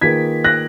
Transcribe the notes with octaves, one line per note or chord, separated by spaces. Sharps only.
D#3 A#3 F4 G#4 B4 G#6 B6
F#6 A#6